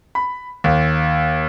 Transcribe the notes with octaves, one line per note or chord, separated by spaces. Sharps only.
B5
D#2